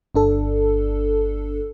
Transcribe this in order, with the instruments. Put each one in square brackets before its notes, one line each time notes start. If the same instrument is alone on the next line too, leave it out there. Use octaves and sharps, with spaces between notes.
[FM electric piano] G1 D4 A4